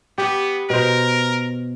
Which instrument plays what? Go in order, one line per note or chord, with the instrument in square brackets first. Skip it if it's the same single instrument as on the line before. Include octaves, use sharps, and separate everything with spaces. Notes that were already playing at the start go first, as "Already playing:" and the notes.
[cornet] B3 [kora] G4
[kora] B2 C5 [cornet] A#4